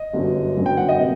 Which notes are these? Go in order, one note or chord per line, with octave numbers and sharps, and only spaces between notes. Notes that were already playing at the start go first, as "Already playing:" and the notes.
Already playing: D#5
G1 F#2 D3 F#3
G1 F#2 D3 F#3
G5
F#5
D#5
C3 A#3